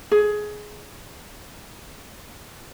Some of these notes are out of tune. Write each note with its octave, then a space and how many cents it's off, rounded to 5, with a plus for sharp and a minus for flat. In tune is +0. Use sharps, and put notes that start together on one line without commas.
G#4 +15